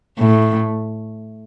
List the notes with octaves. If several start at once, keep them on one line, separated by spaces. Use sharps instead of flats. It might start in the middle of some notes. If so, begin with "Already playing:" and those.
A2